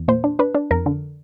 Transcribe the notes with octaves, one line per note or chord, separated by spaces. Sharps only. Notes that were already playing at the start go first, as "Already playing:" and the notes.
Already playing: E2
A#2 C5
D4
D4 B4
D4
F2 A#4
D3